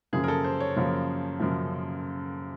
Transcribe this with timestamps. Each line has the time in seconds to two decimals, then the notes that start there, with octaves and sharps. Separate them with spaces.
0.13 F#2 C#3 F3 A#3 G#4
0.24 A#4
0.28 A4
0.44 C5
0.60 C#5
0.76 F#2 C#3 F3 A#3
1.39 F#2 C#3 F3 A#3